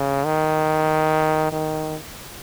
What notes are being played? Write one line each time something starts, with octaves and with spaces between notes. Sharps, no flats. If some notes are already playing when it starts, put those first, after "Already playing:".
Already playing: C#3
D#3
D#3